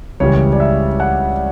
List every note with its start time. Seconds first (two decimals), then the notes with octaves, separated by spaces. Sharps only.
0.20 C#2 C#3 E3 G3 C#5
0.53 D5
0.60 E5
1.00 F#5